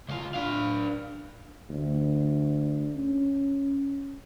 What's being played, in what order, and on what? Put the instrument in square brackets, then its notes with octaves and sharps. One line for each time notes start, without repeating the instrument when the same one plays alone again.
[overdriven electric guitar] C#2 F4
D4 F5
[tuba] D2
C#4